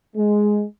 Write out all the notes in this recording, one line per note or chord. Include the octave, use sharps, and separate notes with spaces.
G#3